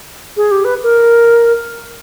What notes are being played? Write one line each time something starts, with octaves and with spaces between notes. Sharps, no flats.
G#4
G4
B4
A#4